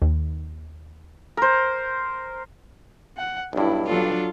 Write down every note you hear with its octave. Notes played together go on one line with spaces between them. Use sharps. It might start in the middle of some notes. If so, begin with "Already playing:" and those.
D#2
A#4 C5
F#5
B1 G2 D4 E4
F#3 D4 F4 A4